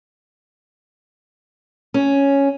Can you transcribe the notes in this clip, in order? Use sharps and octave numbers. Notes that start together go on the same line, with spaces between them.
C#4